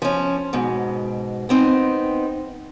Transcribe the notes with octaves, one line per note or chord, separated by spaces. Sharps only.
F3 C#4
G#2 B2
B3 C4 D#4